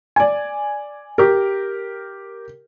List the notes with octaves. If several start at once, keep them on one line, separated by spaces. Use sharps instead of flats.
D5 G#5
G4 A#4